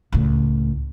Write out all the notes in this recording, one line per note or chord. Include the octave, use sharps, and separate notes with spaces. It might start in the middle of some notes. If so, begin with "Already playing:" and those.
C#2 A2